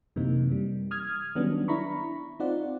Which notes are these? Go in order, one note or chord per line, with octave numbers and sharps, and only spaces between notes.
F#2 C3 E3 A#3 D#4
G3
D#6 F6 G#6
D#3 F#3 G3 B3 C#4 D4
D4 E4 A#5 B5 C#6
C4 D#4 F4 D5 F#5